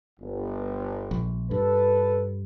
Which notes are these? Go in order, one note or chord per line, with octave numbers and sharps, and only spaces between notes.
G1
A#1
G2 A4 B4